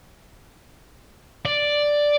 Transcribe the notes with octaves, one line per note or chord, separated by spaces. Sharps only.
D5